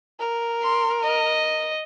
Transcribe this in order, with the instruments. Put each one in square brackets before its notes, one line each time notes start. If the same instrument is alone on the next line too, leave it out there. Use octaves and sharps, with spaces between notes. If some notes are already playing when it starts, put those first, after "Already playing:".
[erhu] A#4
[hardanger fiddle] C6
D#5